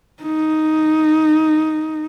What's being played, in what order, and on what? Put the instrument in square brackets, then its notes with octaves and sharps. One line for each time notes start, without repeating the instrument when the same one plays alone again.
[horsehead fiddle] D#4